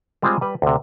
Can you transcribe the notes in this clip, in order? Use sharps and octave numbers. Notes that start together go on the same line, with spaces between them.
G3 G#3 C4 F4 G#4 C5
G3 B4
D2 C3